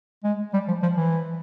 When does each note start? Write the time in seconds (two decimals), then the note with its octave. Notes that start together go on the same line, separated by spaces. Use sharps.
0.24 G#3
0.53 G3
0.68 F3
0.82 F3
0.96 E3